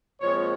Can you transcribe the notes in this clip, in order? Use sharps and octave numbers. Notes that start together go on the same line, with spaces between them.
A#2 F3 G#3 C4 C#5